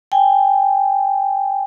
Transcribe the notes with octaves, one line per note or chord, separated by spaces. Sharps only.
G5 G#5